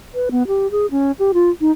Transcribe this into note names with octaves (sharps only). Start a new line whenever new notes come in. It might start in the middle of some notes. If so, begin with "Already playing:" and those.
B4
B3
G4
G#4
C#4
G4
F4
D#4